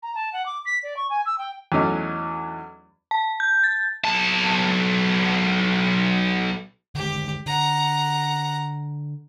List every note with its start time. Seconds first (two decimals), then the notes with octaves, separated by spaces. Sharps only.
0.03 A#5
0.15 A5
0.33 F#5
0.46 D6
0.66 B6
0.83 D5
0.97 C#6
1.10 G#5
1.26 E6
1.38 G5
1.72 E2 F#3 A3 C#4 D#4
3.11 A5
3.40 G6
3.64 A6
4.04 B1 A5
6.95 D3 D#3 G#3 G4
7.46 D3 F#5 A#5